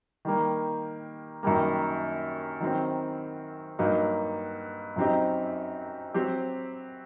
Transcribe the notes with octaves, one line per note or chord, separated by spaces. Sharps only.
D#3 G3 A#3
F#2 D#3 G3 A#3
D#3 F#3 C4
G2 F#3 A#3 D#4
F#2 F#3 C4 D#4 G4
F#3 C4 G4